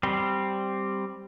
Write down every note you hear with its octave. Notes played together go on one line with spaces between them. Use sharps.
G3 C4